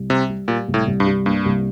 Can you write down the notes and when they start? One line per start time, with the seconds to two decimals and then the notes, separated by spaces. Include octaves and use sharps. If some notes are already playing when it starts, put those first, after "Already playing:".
Already playing: C2
0.10 C3 G3
0.29 G3
0.48 A#2 G3
0.68 C2
0.74 A2
0.87 C2
1.00 G2
1.06 G3
1.25 G2 A#3
1.45 C2